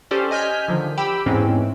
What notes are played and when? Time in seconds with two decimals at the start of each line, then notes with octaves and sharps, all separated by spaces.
0.11 C#4 G4 A4 C5 D5
0.31 D#5 G#5 F6 G6 B6
0.68 D3 D#3 F3
0.98 G4 G5 B5 E6
1.26 E2 G#2 E3 G#3 C4 C#4